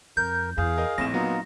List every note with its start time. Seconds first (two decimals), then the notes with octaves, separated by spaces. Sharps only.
0.17 F2 A#4 G6
0.58 E2 G#4 F5
0.78 A#4 D#5
0.98 A#1 A2 C4 A#6 E7
1.14 A#2 F#3 B3 D#4 F4